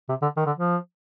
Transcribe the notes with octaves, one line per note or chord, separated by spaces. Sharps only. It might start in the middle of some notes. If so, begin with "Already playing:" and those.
C3
D3
D#3
D3
F3